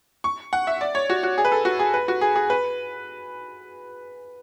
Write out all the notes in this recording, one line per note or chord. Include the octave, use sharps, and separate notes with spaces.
C#6
F#5
E5
D5
C#5
F#4
F#4
G#4
B4
A4
F#4
G#4
B4
F#4
G#4
G#4
B4